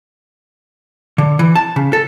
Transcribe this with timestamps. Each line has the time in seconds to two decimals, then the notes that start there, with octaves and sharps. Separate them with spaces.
1.18 D3
1.39 E3
1.55 A5
1.76 C#3
1.93 A4